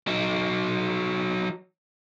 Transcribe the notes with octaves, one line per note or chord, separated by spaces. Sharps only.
F#3 D#4